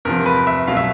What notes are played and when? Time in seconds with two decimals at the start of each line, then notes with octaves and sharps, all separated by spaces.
0.05 E2 C3 F3 A#4
0.26 B4
0.47 E5
0.67 C2 B2 F#3 F5
0.77 E5